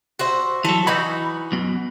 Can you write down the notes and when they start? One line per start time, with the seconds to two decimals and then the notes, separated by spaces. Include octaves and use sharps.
0.19 F#4 C5 E5
0.65 E3 F#3 A4
0.87 E3 D#4 F#4 B5
1.52 B1 F#2 B2